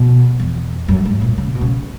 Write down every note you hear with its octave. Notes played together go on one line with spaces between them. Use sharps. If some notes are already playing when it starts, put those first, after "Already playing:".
Already playing: B2
E2
F#2
G#2
A#2
C#3
B2
C#3